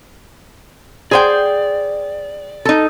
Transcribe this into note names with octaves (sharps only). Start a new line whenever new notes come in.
G#4 C5 D5 G5
D#4 A4